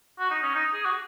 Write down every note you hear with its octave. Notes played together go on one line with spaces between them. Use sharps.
F#4
D#4
C#4
D#4
G#4
F#4